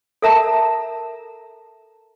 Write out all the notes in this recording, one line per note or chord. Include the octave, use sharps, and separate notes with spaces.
A4 A#4 E5 A5 A#5